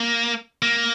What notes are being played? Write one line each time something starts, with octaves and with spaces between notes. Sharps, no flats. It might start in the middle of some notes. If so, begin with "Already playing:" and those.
Already playing: A#3
A#3